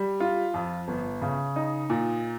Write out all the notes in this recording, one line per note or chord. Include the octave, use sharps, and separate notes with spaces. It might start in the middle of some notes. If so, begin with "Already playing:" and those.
Already playing: G3
F4
F2
G1
C#3
D#4
A#2